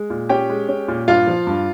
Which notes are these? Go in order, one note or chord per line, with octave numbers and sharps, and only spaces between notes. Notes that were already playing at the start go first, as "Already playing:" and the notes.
Already playing: G#3
A#2
C#4 G4 G5
G#3
C#4
A#2
G2 F4 F5
F3
G2